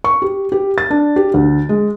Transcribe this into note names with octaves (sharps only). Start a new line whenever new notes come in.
C#6
G4
G4
A6
D4
G4
D2
G#3